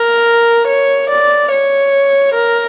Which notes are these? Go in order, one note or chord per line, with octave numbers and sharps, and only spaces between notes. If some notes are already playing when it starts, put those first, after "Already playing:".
Already playing: A#4
C#5
D5
C#5
A#4